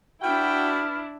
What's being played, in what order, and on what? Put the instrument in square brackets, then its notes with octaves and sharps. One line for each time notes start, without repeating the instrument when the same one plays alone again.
[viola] D4 E4 [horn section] F#4 G5 [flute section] B4 B5 F6